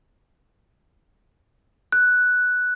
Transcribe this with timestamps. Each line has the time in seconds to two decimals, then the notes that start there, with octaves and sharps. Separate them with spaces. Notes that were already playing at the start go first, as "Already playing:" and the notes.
1.92 F#6